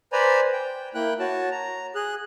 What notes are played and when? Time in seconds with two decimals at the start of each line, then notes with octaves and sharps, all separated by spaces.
0.12 B4 C5 D5 G#5 A#5 B5
0.53 G5
0.95 A#3 E4 G5 F#6
1.19 F#4 C#5 A5
1.51 A#5
1.95 G#4 F#6